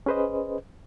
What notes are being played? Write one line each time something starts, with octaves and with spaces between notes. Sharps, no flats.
C#4 G#4 B4 C5 D#5